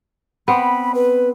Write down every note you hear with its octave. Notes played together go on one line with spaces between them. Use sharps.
B3 C4 B5
B4